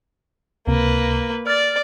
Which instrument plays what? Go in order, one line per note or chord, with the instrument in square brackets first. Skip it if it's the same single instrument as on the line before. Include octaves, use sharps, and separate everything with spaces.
[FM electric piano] C#2 C3 [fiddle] A#3 B4
[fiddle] D5 [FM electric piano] F6 A6